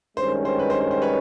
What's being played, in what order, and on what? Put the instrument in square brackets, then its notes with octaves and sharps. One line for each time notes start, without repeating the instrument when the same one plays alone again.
[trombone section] G2 D#3 G#3 C#4 [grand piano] C5
[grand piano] C5
B4
C5
C5
C5
B4 C#5